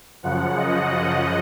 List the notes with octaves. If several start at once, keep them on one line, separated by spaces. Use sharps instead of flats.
F#2 C#3 F3 F#5
D#5